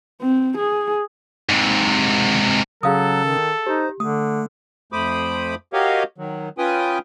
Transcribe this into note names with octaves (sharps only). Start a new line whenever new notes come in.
C4
G#4
G#2 C3
C#3 F#3 C#4 G#4 A4 F5 D#6
D#3
D#4 G4 C5
D3 A3 D#6
F2 A3 C5 B5 D6 D#6
F#4 G4 A#4 C#5 D#5 F5
D#3 F#3
C#4 F4 B4 G5 G#5 D#6